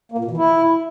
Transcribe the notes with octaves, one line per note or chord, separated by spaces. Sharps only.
A#3
A#2
B2
E3
E4